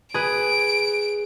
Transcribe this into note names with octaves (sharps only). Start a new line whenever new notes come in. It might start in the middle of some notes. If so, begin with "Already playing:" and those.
G#4 B4 D7